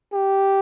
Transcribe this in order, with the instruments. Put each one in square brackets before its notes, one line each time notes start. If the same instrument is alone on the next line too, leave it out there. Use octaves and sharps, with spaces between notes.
[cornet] G4